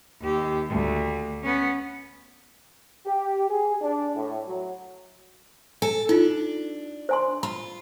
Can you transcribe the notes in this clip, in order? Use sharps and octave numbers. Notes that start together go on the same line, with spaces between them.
D#2 G4
D2
B3 C#4
G4
G#4
D4
A2
F#3
A4 G#5
D4 D#4 F4
C5 G#5 C6
F4 B5